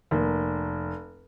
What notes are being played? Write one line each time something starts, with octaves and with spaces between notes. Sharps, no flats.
F1 A#3